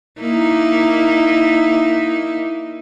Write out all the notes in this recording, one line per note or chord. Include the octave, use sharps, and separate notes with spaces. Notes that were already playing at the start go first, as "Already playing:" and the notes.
A#3 D#4 E4